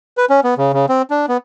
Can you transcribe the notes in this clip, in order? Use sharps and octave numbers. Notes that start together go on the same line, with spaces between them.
B4
C#4
B3
C#3
C#3
C4
D4
B3